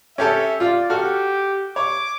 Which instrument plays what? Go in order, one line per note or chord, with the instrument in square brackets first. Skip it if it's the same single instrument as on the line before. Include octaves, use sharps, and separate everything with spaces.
[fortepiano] C#4 G4 A4 [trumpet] E5
[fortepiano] F4 [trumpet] D5
[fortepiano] F#4 A4 F6 [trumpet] G4
[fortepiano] C#5 [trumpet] D6